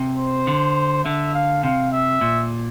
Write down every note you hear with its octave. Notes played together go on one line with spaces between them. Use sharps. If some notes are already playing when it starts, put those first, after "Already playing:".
Already playing: C3
C5
D3
D3 E5
F5
C3 F5
E5
A#2